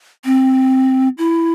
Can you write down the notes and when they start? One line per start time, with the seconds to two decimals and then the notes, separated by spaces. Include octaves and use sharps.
0.25 C4
1.18 E4